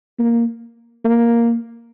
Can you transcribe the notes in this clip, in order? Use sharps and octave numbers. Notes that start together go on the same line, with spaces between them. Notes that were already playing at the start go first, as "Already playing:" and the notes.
A#3
A#3